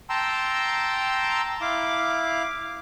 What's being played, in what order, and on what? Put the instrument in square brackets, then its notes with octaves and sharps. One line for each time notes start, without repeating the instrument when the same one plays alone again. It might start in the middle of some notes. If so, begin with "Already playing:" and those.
[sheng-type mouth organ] G5 A5 A#5 C6 E6
E4 F5 D6